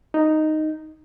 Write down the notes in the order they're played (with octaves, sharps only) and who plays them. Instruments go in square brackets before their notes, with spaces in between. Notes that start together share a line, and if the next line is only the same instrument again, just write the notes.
[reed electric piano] D#4